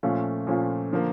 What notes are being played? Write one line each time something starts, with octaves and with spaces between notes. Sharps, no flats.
A#2 F3 A3 C#4 F4
A#2 F3 A3 C#4 F4
D3 F3 A#3